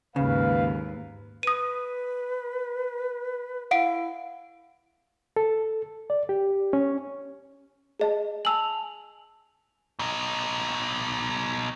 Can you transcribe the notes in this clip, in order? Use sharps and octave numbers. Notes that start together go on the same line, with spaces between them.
D#2 G#2 C#3 B4 F5
B4 D#6 D#7
E4 F5 F#5 D7
A4
D5
G4
C#4
G#4 D#5 A5
G#5 A5 E6 F7 F#7
B2 D#4